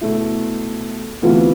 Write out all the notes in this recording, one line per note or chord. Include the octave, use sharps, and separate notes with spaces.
B2 A3 E4
D2 C3 E3 B3 F4